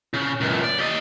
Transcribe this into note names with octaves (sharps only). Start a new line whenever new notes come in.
C#3
C#2 F#2
D5
G4 D#5